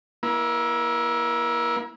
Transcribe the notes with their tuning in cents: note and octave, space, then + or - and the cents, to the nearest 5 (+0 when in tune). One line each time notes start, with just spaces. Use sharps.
A#3 +35 E4 +0